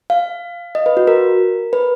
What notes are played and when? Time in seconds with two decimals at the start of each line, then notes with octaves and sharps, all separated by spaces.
0.10 F5
0.75 D#5
0.86 B4
0.97 F#4
1.07 A#4
1.73 B4